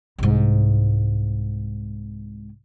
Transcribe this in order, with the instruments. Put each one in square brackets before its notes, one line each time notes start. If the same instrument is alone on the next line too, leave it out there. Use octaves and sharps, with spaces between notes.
[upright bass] C2 G#2